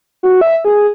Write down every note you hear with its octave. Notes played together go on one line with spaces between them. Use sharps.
F#4
E5
G#4